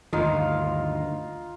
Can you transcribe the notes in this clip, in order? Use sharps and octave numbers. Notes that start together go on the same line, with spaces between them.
D2 G2 D#3 D#4 F4 F5